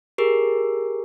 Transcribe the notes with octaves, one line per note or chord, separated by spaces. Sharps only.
G4 G#4 A#4